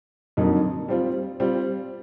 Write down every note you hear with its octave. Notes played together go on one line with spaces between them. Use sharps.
F2 D3 F#3 A#3 D#4
G3 C4 F4
G3 C4 F4